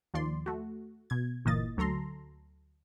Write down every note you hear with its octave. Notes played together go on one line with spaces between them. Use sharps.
D#2 F3 D5 C6
A3 F#4
B2 G#6
G1 A#2 E3 A#3 D#5 A6
D2 F#3 A4 A#5 C6